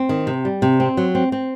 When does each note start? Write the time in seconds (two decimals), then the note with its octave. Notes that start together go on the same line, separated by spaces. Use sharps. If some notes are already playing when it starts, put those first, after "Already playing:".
Already playing: C4
0.09 D#3
0.27 C3
0.45 G3
0.62 C3
0.80 C4
0.97 F#3
1.15 C4
1.32 C4